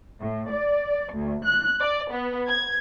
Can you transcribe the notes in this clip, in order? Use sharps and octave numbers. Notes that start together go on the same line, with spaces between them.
A2
D5
D2
F#6
D5
B3
G#6